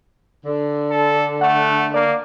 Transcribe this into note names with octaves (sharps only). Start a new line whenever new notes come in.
D3
A4
A3 F#5
A#3 D5